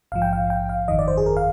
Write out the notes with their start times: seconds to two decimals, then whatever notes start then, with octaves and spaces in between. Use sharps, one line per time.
0.12 A#1 G#2 F3 F5
0.22 G5
0.33 F5
0.50 G5
0.69 F5
0.88 G1 F2 D#3 D#5
0.99 D5
1.08 C5
1.17 G#4
1.26 A#4
1.37 F5